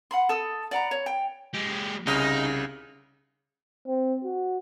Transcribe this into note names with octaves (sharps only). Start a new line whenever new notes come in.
F#5 B5 C6
A4 D#6
D5 F#5 A#5 B5
C#5
G5
G#3 G4
C2 C#3 D#4
C4
F#4